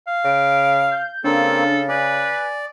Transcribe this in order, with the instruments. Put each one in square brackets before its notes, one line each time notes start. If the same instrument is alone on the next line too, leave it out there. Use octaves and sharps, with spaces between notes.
[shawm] F5
[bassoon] C#3 [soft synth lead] D7
[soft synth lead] G6
[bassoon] C#3 [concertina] A#3 C4 [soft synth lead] D4 [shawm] A4
[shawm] B4 [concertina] D5 [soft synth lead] G#5